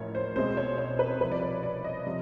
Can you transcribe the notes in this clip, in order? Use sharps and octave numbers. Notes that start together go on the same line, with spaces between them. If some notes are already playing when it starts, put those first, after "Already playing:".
Already playing: A1 A2 F3 A#3 C#4 C#5
C5
B1 B2 G#3 C4 C5
C#5
C#5
B4
C2 C3 F3 B4
D5
C#5
D5
D#5
C3 F3